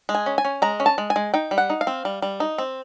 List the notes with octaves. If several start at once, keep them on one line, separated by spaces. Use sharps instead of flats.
G#3
G#5
C#4
G#5
C#4
G#3 A#5
C#4
A5
G#3
G#5
G#3
D#4 G5
G3
F#5
D#4
F5
C4
G3
G3
D#4
C4